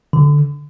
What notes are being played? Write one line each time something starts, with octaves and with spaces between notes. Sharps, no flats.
D3